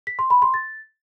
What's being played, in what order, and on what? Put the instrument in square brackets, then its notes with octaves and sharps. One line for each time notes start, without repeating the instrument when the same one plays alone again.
[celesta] B6
C6
B5
C6
A6